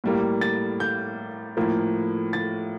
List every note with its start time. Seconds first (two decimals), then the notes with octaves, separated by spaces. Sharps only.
0.04 A2 G3 A#3
0.41 A6
0.80 G6
1.57 A2 F3 A#3
2.33 A6